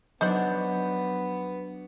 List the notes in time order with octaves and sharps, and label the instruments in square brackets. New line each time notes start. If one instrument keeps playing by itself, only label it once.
[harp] F#3 D4 [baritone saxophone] B3 [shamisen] D#4 C5 F#5